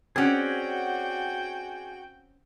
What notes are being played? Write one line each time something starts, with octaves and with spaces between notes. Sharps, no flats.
C4 C#4 F#4 G#4 D5 F#5 G5